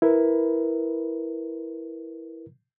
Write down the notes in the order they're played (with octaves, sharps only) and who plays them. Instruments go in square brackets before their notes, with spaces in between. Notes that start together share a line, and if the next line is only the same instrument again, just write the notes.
[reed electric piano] E4 A#4 B4